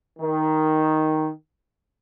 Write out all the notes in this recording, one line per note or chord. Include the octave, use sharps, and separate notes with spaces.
D#3